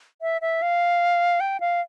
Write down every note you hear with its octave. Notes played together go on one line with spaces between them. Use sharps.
E5
E5
F5
G5
F5